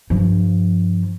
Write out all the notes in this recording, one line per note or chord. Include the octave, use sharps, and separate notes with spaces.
G2 F3